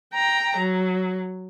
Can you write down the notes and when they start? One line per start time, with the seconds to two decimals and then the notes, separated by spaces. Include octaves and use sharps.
0.14 G5 A#5
0.58 F#3